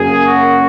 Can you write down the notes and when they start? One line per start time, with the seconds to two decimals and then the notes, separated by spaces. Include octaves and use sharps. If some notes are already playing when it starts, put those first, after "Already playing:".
Already playing: F#2 C#3 F#3 A#3 G#4
0.24 F#4